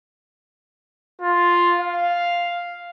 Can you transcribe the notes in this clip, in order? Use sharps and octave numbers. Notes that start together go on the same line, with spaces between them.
F4
F5